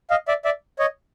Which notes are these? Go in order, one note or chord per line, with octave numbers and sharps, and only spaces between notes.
D#5 F5
D5 E5
D5 E5
C#5 D#5